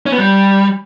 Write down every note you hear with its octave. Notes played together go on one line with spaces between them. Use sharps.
C#4
B3
G3